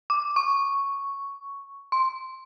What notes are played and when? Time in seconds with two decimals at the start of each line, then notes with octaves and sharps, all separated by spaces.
0.10 D6
0.36 C#6
1.92 C6